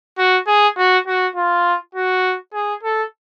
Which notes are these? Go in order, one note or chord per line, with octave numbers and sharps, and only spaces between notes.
F#4
G#4
F#4
F#4
F4
F#4
G#4
A4